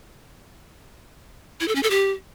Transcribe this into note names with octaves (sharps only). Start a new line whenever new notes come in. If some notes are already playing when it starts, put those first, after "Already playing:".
E4
A4
C#4
A4
G4